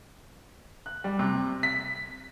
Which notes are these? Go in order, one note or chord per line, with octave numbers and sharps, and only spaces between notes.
F#6
G3
C3
B6